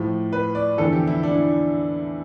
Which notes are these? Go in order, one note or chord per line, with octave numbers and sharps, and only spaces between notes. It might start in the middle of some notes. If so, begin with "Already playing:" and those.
Already playing: A2 F3 G4
B4
D5
E2 D3 F3 A4
G4
E4
D4
E4